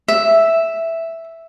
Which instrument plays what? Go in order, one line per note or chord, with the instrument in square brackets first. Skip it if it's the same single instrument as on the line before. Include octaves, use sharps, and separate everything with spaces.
[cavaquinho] E5